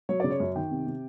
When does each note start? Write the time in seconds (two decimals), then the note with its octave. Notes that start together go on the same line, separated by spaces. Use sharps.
0.09 F#3 C#5
0.20 C#3 D5
0.30 C#5
0.40 F#2
0.55 D#3 G5
0.71 C3
0.87 C3